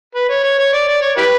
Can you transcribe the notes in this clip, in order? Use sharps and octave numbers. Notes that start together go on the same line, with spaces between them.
B4
C#5
C#5
C#5
D5
D5
C#5
E4 G4 B4